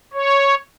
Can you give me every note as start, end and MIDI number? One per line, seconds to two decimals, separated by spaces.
0.13 0.55 73